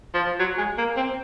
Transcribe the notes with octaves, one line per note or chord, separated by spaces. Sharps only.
F3
F#3
G#3
A#3
C4